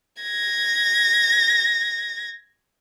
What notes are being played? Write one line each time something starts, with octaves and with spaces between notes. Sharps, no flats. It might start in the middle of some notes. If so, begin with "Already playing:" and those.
G#6 A#6